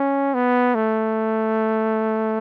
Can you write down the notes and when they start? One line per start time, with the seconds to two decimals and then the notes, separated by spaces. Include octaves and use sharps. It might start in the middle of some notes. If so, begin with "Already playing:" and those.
Already playing: C#4
0.34 B3
0.75 A3